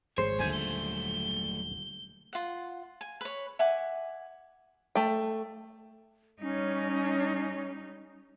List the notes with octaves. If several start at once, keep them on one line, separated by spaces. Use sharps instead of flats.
G#1 G#4 C5 C#5 C7
D#1 F#2 D3 A3 G#5 G6
G7
F4 F#5
G#5
B4 C#5
E5 F#5 G#5 D6
A3 G5
G3 C#4 D#4